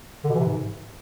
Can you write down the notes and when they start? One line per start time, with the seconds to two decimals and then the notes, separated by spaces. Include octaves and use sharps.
0.24 D3
0.29 B2
0.35 E3
0.40 C3
0.45 G#2